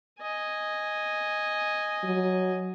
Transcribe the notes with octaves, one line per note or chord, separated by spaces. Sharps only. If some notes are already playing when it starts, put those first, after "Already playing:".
D#5 G#5
F#3